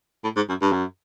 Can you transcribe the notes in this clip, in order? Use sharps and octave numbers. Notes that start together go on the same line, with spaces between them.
A2
G#2
F#2
G2
F#2